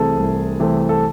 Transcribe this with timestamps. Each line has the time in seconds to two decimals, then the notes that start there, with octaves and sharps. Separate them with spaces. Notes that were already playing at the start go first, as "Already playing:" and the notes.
Already playing: C2 C3 E3 A3 C4 G#4 A4
0.17 C2
0.60 C3 E3 A3 C4
0.89 A4